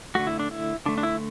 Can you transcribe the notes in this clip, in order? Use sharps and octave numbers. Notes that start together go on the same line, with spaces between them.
D3 A3 F#4
E4
D4
E4
D3 A3 D4
D4
E4